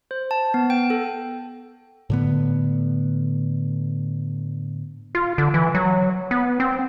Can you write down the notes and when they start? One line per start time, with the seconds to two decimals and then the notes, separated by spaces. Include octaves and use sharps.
0.11 C5
0.31 A5
0.54 B3
0.70 G5
0.90 A4
2.10 A2 D3 B3
5.15 F4
5.38 D3
5.54 E3
5.75 F#3
6.31 B3
6.60 C4